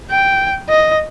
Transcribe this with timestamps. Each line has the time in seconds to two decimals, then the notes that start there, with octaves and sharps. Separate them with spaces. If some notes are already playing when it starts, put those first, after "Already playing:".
0.11 G5
0.69 D#5